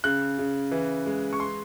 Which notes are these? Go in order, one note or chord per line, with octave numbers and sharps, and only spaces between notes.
C#3 F#6
C#3
E3
G#3
C#6
C6